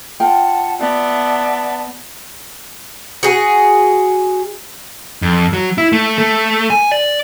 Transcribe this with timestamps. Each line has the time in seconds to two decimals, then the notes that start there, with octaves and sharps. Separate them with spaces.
0.20 F4 F#5 G5 A5
0.80 B3 D5 E5 A5
3.23 F#4 G#4
5.22 F2
5.53 F#3
5.78 E4
5.93 A3
6.18 A3
6.70 G#5
6.92 D5